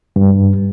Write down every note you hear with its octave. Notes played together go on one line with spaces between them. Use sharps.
G2